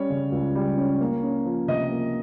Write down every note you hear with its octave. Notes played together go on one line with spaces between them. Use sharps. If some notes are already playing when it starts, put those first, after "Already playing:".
Already playing: G3 C#4 C#5
C#3
C#2
G3
C#4
A#3
C#4
F3
C3 D#5
A#3